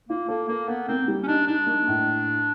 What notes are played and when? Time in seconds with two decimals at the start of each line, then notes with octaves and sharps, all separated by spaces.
0.09 A#3 F4
0.28 A#3 A4
0.49 A#3 A#4
0.68 B3 A#4
0.88 A#3 C4
1.08 G3
1.24 C#4
1.28 D4 D#4
1.47 D4 D#4
1.67 A#3
1.88 A2